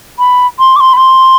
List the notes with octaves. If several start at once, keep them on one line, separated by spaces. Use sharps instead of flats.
B5
C6
D6
C6
B5
C6